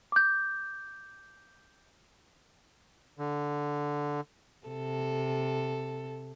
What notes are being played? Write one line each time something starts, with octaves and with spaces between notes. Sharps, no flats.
D6 G6
D3
C3 A4